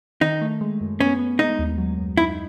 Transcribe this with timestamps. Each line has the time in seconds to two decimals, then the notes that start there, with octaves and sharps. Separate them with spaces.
0.21 D#3 D#4
0.42 A3
0.61 G#3
0.81 F#2
1.00 B3 C#4
1.19 B3
1.39 G#3 D#4
1.59 D#2
1.78 F#3
1.98 F#2
2.17 D#4 E4